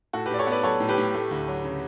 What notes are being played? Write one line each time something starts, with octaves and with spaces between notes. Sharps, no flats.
A2 F#4 A4
G4 B4
A2 D5
A4 C#5
B3 B4 D5
F#3 A4 C#5
A2
G4 B4
A2
A3
D2
F#3
C#3